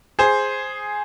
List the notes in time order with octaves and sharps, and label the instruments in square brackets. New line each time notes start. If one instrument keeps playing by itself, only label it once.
[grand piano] G#4 C5